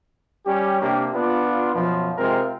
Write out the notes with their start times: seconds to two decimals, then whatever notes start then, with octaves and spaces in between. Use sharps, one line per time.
0.46 G3 C#4 G4
0.81 C3 A#3 D4 G4
1.14 B3 D4 F4
1.74 F#2 B2 F3
2.17 C3 G#3 C4 F4 A#4